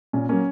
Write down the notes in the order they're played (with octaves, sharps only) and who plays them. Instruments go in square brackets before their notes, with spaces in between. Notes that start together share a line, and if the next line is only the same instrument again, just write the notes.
[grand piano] A#2 C#4
F#3 A#3 C#4